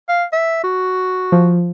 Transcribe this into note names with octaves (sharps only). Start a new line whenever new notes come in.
F5
E5
F#4
F3